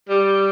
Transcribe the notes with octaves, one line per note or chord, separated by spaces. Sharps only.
G3